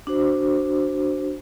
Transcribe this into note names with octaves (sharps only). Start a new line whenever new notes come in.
D4 F#4 C5